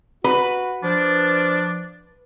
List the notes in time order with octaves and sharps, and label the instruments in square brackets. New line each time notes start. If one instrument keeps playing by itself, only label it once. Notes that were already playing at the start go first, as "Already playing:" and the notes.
[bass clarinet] F#4 [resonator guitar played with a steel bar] B4
[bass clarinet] F3 [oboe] D4